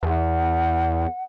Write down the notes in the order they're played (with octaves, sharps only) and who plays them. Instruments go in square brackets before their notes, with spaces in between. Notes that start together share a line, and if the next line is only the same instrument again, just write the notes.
[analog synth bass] E2 [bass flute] F#5